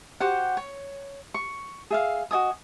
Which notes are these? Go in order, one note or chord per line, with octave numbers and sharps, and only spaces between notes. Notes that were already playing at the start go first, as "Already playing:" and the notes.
F#4 G4 C5 F#5
C#5
C#6
G#4 E5 F5
F#4 D#5 G#5 D#6